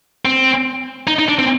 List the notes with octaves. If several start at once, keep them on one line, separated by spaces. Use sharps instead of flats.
C4
D#4
D#4
D4
C4